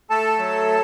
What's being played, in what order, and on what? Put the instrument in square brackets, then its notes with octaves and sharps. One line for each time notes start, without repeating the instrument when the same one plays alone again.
[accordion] A3 A4 A5
F#3